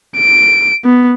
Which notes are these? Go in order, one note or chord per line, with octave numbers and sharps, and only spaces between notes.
D7
B3